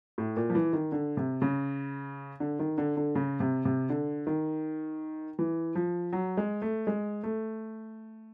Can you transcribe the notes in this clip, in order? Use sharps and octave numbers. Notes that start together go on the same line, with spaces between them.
A2
A#2
F3
E3
D#3
D3
C3
C#3
D3
D#3
D3
D3
C#3
C3
C3
D3
D#3
E3
F3
F#3
G#3
A3
G#3
A3